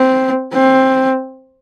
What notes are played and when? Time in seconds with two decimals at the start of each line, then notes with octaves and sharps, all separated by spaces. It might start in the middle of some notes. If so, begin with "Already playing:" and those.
Already playing: C4
0.54 C4